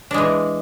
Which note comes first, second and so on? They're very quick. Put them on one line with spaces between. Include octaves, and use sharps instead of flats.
D4 G#3 E3